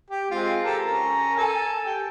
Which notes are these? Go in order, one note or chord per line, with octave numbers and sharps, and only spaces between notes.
G4
G#3 C4 F4
G4 A4 A#4
C#4 A#4
A4 G#5 A5
G4 G5